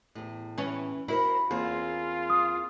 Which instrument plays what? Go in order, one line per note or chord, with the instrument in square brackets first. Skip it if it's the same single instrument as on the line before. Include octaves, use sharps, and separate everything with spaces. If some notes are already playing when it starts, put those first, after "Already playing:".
[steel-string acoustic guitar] E2 A2
[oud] E3 C#4
[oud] E4 [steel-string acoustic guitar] F#4 A#4 C5
[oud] E2 [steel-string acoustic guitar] A#3 C4 G#4 [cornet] F4
[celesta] D#6